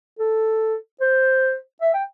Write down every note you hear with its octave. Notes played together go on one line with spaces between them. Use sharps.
A4
C5
E5
G5